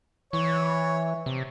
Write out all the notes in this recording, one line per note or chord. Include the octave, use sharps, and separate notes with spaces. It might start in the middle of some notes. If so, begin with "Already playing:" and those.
E3 C#5
C3